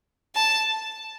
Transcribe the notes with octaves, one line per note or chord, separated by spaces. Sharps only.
A5